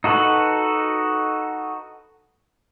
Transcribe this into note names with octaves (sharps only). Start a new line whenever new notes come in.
D#4 F#4 A4 B4